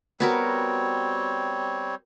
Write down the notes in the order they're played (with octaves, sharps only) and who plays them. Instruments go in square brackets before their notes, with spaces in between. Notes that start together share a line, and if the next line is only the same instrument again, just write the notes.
[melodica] G3 C4 C#5 [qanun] B3 F#4 A#4